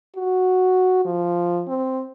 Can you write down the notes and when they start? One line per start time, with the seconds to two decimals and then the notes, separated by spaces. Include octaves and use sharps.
0.16 F#4
1.05 F3
1.68 C4